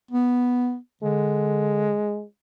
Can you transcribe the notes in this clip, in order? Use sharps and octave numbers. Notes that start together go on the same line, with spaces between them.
B3
D3 G#3